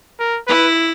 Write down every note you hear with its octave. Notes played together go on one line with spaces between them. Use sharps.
A#4
E4 B4